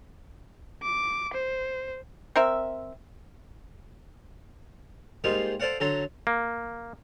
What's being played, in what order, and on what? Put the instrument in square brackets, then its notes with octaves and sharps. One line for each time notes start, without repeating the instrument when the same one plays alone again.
[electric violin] D6
C5
[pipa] C4 A#4 E5
[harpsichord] G#2 G3 A#3 D#4 F4 C6
A4 C5 D5 F5 F#5
D3 F#3 A4 A#5 C6
[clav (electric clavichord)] A#3